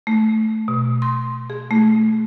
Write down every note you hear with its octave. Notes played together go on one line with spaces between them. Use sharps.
A3
B2
C6
G#4
A3